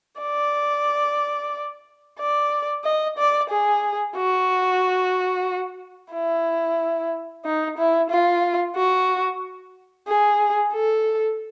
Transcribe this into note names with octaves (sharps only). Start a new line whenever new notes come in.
D5
D5
D#5
D5
G#4
F#4
E4
D#4
E4
F4
F#4
G#4
A4